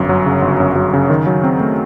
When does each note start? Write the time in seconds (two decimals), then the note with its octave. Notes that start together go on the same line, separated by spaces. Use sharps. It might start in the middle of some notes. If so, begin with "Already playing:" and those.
Already playing: G1 F#2
0.09 F#3
0.26 C#3
0.42 G1
0.60 F#2
0.76 F#3
0.94 C#3
1.10 D#3
1.27 F#3
1.44 C4
1.60 A3